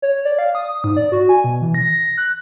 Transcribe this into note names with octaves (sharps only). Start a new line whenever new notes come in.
C#5
D5
F5
D#6
G#2
D5
F#4
G#5
B2
E3
A#6
F#6